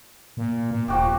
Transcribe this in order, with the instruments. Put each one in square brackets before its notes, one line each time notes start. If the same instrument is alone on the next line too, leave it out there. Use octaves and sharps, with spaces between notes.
[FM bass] A#2
A#2
[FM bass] D#1 [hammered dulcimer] F3 F#4 G4